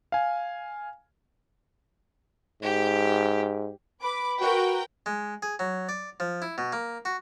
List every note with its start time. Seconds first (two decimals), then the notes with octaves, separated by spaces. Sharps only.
0.12 F5 G#5
2.63 G#2 G4
4.02 B4 B5 D6
4.41 F#4 A#4 B4 G5
5.06 G#3
5.42 G#4
5.59 F#3
5.89 D5
6.20 F3
6.42 E4
6.58 B2
6.72 A#3
7.05 F#4